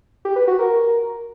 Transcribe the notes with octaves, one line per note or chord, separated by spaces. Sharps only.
G4
B4
F#4
A#4